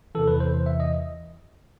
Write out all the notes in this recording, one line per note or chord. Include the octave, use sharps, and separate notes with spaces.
E2 C3 E3 A4
B4
C5
E5
D#5